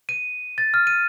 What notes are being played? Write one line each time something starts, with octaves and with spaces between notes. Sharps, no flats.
D#7
A6
F6
D#7